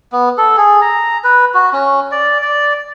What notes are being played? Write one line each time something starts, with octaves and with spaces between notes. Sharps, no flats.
B3
A4
G#4
A#5
B4
F#4
C#4
D5
D5